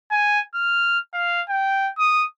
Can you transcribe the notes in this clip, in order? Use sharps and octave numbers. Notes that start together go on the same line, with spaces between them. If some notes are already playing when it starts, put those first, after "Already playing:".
G#5
F6
F5
G5
D#6